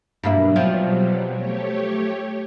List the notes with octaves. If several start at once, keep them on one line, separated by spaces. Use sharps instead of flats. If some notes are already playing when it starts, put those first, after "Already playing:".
G2 B2 F#3 G3 A#3 E4
F3 C4
A3 G4 C#5